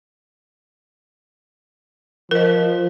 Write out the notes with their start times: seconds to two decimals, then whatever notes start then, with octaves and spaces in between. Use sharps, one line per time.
2.31 F3 A#4 D#5